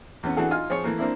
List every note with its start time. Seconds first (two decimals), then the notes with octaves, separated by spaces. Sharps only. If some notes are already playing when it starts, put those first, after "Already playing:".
0.23 E2 B3 C#4
0.37 E3 D4 F#4 G#4 A4
0.51 D#4 F4 G#5 F6
0.70 F3 G#4 C#5
0.84 E3 A3 A#3
0.98 A#3 C4 D4 E4